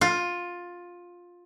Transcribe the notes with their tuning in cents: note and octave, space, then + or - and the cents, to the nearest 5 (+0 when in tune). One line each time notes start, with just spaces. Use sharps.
F4 +15